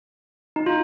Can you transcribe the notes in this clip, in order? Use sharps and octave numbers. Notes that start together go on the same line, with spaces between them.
D#4
F4